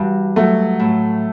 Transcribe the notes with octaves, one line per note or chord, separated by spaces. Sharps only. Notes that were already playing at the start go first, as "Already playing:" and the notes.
Already playing: G2 E3 F#4
F#3 A3
A2